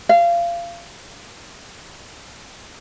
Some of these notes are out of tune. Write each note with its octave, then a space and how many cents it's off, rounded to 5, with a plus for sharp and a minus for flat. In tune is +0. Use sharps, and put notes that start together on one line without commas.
F5 -25